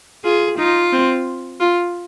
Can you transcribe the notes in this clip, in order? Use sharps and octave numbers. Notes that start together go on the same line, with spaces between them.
F4 G#4
D#4 F4
C4
F4